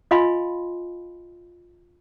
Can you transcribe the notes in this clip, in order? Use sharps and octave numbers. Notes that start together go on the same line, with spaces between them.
F4 D#5 F5 G#5 B5 C6